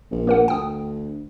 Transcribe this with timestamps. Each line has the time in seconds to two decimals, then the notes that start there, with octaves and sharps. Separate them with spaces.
0.11 A#1
0.27 A#3 A#4 F#5
0.48 D2 G5 D#6